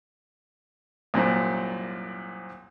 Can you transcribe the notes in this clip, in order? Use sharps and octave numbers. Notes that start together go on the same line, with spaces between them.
C2 F#2 A#2